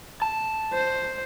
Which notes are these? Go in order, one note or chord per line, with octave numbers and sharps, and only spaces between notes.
A5
C5